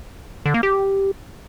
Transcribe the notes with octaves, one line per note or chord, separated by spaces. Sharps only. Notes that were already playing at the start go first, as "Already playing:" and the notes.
D3
A#3
G4